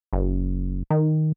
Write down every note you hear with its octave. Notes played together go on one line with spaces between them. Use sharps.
F#1
D#3